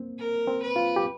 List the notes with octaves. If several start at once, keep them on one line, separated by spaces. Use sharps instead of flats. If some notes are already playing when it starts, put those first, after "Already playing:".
Already playing: A#3 C4
A#4
C4
B4
F4
G4